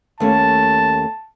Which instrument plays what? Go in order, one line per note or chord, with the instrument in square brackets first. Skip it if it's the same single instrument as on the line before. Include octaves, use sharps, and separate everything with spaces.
[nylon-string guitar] D#2 A3 C#4 [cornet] A5